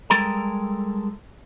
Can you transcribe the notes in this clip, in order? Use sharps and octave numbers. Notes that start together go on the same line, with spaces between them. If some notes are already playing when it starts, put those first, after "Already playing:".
G3 G#3 A4 A#4 A#5